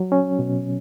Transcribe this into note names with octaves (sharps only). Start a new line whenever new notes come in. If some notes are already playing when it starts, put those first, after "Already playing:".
Already playing: F#3
C#4
B2